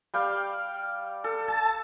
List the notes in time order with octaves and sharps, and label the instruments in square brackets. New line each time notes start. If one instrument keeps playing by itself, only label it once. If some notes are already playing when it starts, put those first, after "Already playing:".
[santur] G3 F5 G5
A4
[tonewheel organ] A5